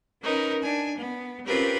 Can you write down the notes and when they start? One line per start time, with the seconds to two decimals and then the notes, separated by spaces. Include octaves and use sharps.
0.23 C#4 D#4 A#4 B4
0.61 D4 G#5
0.96 B3
1.45 C4 C#4 F4 G4 A#4 B4